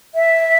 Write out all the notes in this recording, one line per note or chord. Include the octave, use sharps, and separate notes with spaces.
E5